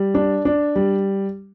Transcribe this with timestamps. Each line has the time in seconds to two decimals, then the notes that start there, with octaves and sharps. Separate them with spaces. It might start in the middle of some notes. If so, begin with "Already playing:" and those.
Already playing: G3
0.15 D4
0.45 D4
0.76 G3